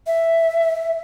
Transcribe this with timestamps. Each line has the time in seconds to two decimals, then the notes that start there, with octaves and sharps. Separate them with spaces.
0.07 E5